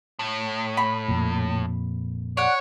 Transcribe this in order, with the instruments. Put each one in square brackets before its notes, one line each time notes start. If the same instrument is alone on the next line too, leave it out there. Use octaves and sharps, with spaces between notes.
[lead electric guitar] A2
[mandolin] B5
[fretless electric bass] F2 A#2
[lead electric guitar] C#5 [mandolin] D5 F#5